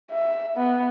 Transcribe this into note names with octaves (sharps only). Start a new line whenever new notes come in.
E5
B3